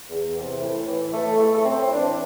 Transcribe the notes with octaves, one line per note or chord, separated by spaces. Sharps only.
E2
C3 E3
A2
E3
A2 A3
E3 A3
A3
A2 C4
E4
E3 D4